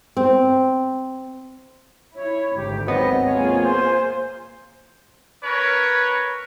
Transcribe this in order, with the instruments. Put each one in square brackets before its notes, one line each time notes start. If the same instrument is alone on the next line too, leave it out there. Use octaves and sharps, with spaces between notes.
[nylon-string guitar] C4
[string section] E4 [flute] C#5
[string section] G#1 D2 G#2 [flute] G4
[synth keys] F#3 B3 C4 [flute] D#5
[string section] A#3 F4 G#4 [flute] C#5
[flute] C5
[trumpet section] C#4 A#4 B4 C#5